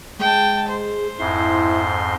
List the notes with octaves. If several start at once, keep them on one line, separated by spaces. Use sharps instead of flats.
G#3 G5 A5
C5
F2 G#2 E4 C6